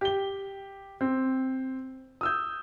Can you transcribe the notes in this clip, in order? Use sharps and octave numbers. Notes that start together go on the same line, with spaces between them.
G4 G7
C4
D#6 E6 G6